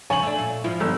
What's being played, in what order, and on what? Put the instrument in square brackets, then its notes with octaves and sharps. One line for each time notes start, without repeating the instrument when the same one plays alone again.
[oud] C#3 F3 C#5 [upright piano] G#5 F#7
[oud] A3 D4
A#2
[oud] G#2 F3 E4 [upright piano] F4
[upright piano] G1 E6